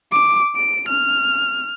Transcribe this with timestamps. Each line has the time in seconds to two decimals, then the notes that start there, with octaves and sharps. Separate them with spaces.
0.12 D6
0.56 D7
0.89 F6